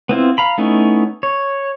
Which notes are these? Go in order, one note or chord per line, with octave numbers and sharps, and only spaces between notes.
B3 C4 E4 F4
F5 A#5 B5
A3 B3 C#4 D#4 E4
C#5